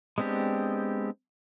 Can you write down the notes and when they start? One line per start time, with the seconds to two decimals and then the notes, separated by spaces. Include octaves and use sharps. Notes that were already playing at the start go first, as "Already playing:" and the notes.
0.18 G#3 B3 C4 D4 G4